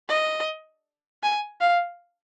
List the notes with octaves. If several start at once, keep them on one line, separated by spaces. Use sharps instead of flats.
D#5
G#5
F5